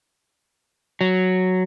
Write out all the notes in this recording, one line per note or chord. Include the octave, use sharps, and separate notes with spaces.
F#3